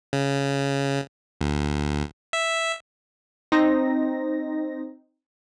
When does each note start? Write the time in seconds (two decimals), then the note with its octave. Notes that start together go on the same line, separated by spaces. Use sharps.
0.13 C#3
1.41 D2
2.33 E5
3.52 C4 D#4 C5 A#6